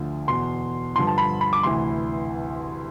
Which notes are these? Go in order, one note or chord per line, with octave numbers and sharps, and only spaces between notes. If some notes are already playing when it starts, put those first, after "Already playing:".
Already playing: D2 D3 F3
E2 B2 C6
G2 D3 F3 C6
A5
B5
B5
D6
D2 C3 E3 C6